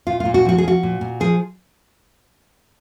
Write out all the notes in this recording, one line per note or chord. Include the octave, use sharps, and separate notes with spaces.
A#2 F4
F4
A#2
F#4
F3 F#4
G#4
F3 F#4
A#2
A#2
F3 G#4